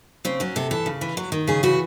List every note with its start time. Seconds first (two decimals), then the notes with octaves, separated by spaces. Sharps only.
0.25 C#3 C4
0.40 F#3 C#4
0.56 C3 A4
0.71 E3 A4
0.86 C#3
1.01 E3
1.17 F#3
1.32 D#3
1.48 C#3 G#4
1.63 E3 F#4